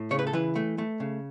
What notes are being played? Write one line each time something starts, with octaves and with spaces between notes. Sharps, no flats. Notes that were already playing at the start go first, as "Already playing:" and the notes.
Already playing: A2
C#3 C#5
B4
A4
E3 B4
A3
A3
C#3